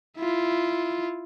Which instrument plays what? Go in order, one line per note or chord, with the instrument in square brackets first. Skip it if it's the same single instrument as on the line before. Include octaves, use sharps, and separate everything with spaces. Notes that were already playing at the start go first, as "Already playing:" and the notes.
[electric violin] E4 F4